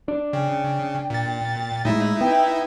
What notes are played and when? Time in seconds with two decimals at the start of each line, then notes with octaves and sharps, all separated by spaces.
0.08 D4
0.33 C#3 G5
1.10 A#2 A6
1.85 A2 G#3 D#4 E4 E5
2.21 B3 G5